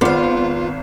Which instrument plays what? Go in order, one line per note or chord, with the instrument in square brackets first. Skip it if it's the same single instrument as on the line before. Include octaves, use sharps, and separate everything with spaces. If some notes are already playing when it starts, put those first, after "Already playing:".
[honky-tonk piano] G#1 [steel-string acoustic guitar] B3 F5 [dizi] F4 [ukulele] G#4 C5 D5